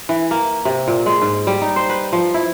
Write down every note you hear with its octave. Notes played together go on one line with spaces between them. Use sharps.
E3
A#3
C3
A#2
G#3
G#2
G3
D#4
C5
B4
F3
E4